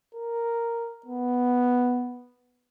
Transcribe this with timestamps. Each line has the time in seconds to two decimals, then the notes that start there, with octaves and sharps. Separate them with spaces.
0.15 A#4
1.06 B3